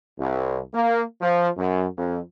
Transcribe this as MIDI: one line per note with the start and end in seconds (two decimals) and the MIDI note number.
0.18 0.59 36
0.74 1.02 58
1.20 1.49 53
1.58 1.86 42
1.97 2.18 41